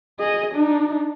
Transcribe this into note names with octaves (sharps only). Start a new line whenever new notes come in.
G#4 D#5
D4 D#4